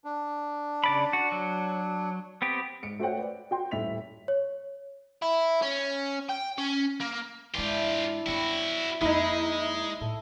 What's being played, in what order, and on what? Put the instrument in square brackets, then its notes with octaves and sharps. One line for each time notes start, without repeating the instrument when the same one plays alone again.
[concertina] D4
[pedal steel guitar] C#3 D5 B5
F#4
F#3
B3 C4 G4
[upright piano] G#2 C#7 D7
A3 F#4 C5 C#5 F#5 G5
B4 D5
F#4 G5 C6
D#1 A1 A2 E4 B6 F7
[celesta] C#5
[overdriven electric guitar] E4
C#4
G5
C#4
A#3
[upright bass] G#2 G#3 [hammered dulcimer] E3 D4 E4 [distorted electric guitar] F4 G4
[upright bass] F#2 B3 [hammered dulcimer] G3 C#5 [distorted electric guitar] E4 F#4
[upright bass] F2 A#3 [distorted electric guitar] G#3 [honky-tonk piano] D#4 E4 [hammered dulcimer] B5
[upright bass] A2 A#3 [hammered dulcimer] A4 E5